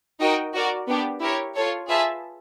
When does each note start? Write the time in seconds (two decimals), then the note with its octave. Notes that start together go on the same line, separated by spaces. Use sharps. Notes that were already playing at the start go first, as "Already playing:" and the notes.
0.20 D#4 F#4 A#4 D#5 G5
0.54 F#4 A#4 D5
0.87 B3 D4 G4
1.20 E4 G4 A#4 C#5
1.55 F4 A4 C#5
1.88 F4 G#4 B4 E5 A5